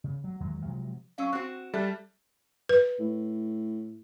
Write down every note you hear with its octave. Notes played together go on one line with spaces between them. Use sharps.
C#3
F#3
E2 D#3 F#3 G#3
C3 F3 F#3 G#3
F#3 C#4 F5 E6
C4 F#4 F#6
G3 A4 E5 F#6
B4
A2